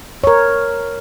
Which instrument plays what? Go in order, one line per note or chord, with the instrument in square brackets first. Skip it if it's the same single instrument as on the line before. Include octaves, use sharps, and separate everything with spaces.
[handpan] A#4 C#5